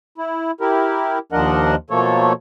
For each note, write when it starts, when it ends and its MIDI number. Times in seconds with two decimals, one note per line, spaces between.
0.18 0.51 64
0.61 1.19 64
0.61 1.19 67
0.61 1.19 70
1.32 1.75 39
1.32 1.75 53
1.32 1.75 62
1.32 1.75 70
1.32 1.75 75
1.32 1.75 78
1.90 2.33 47
1.90 2.33 53
1.90 2.33 57
1.90 2.33 58
1.90 2.33 69
1.90 2.33 73